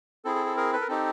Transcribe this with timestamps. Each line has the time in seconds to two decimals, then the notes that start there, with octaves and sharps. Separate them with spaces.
0.25 C4 E4 G#4 A4
0.35 A4
0.46 A4
0.57 G#4 A#4
0.73 A4 B4
0.81 A#4
0.88 C4 D#4 G4 A4